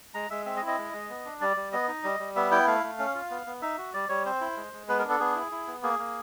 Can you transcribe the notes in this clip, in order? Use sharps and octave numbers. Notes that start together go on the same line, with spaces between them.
G#3 A#5
G#3 E5
C4 E5
D#5
E4
D#5
G#3
G#3
B3
D4
G3 D5
G3
B3 D#5
D#4
G3
G3
B3 E5
E4 G5
A3 F5
A3
C#4
F4
B3
B3
D#4 E5
F#4
G3 D5
G3 C#5
C4 C5
E4
G#3
G#3
B3 B4
A#4
D4
A4
B3 G#4
E4
E4
B3
A#3 G#4
A#3